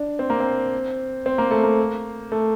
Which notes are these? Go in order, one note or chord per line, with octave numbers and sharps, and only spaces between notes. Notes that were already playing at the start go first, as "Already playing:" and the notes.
Already playing: D4
C4
A#3
C4
C4
A#3
A3
A#3
A3